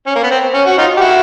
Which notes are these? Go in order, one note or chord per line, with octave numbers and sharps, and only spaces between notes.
C#4
A#3
B3
C4
C#4
F#4
D#4 F4
G4
E4 F#4